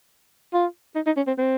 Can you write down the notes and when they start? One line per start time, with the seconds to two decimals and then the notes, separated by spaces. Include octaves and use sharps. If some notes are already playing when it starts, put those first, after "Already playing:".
0.54 F4
0.95 D#4
1.06 D#4
1.16 C#4
1.27 C4
1.38 C4